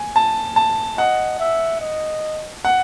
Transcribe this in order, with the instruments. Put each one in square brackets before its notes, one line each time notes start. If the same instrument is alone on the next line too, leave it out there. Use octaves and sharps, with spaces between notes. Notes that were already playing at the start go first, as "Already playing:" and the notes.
Already playing: [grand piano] G#5
A5
A5
[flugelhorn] D#5 [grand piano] F#5
[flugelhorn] E5
D#5
[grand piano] F#5